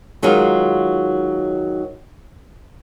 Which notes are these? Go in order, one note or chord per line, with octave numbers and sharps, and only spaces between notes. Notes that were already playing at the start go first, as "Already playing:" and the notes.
D#3 F#3 G#3 D#4 F4